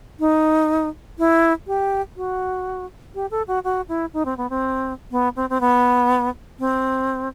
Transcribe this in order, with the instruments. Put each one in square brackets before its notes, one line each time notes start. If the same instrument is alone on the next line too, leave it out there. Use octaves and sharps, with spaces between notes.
[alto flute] D#4
E4
G4
F#4
G4
A4
F#4
F#4
E4
D#4
C4
B3
C4
B3
C4
C4
B3
C4